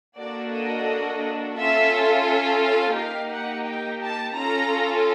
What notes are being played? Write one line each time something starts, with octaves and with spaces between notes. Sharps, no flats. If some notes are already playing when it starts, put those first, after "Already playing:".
A#3 D4 F#4 A4 D5
D#5
C#4 F4 A4 E5
E5
F5
A#3 D#4 G4 F5
F#5
G5
A5
C#4 F4 A4 A#5